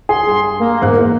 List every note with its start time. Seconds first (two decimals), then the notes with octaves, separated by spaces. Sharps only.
0.09 G#4 C6
0.27 G2
0.59 A#3
0.81 E2 G#2 F#6
0.99 E3